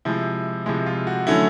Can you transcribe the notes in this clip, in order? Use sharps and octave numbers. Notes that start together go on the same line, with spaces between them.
C3 F3 G#3 E4
C3 F3 G#3 E4
F4
F#4
D3 F#3 A3 C#4 E4